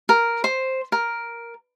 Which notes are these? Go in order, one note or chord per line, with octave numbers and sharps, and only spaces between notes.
A#4
C5
A#4